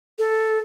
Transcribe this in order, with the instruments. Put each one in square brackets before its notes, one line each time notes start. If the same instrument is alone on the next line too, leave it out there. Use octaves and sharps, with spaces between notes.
[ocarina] A4